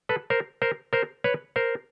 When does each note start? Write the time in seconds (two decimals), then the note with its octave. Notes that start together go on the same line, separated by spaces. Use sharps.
0.09 A4 B4
0.30 A#4 C5
0.62 A#4 C5
0.93 A#4 C5
1.24 B4 C#5
1.56 A#4 C5